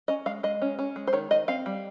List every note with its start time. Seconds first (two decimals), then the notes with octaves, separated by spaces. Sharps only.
0.08 C#4 D#5
0.26 G#3 F5
0.43 G#3 D#5
0.62 C#4
0.79 C#4
0.96 G#3
1.07 C5
1.13 D#3 C#5
1.31 D#3 D#5
1.48 C4 F5
1.66 G3